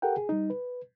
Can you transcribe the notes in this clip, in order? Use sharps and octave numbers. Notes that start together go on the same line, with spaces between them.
G4 A4 A#4 F#5 G5
G#4
G3 D#4
B4